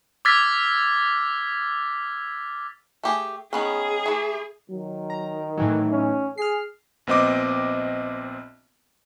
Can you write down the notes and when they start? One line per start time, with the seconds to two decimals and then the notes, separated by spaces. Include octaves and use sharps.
0.25 D6 E6 F6 G#6 A6 B6
3.03 A3 G4 G#4
3.53 D#3 B3 C#4 G#4
4.06 E3 A3
4.70 D#3 F#3
5.10 A#5
5.57 A2 E3 F#3 D#4
5.91 C#4
6.38 G#4 F6 C7
7.07 A#1 B3 C4 D#5 D6